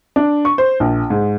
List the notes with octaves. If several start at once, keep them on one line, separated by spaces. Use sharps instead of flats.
D4
C#6
C5
A#1
G#2